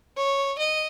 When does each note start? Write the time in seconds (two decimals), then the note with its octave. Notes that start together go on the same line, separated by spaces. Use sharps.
0.17 C#5
0.58 D#5